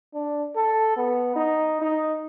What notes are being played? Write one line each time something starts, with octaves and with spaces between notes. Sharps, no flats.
D4
A4
B3
D#4
D#4